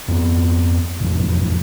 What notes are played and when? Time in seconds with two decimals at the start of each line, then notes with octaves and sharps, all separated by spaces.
0.08 F2 B3
1.00 E1 A1 F2